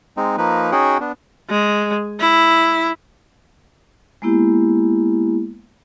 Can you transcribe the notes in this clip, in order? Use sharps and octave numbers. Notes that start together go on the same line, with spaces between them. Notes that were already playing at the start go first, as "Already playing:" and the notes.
G#3 C4 D#4
F3 A#3 D#4 B4
C#4 D#4 F#4 G#4 F#5 G5
B3 D4
G#3
E4
G#3 A#3 B3 E4 G4